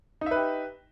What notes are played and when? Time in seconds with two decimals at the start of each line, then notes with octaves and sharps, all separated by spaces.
0.21 D#4
0.26 E5
0.31 B4
0.36 G4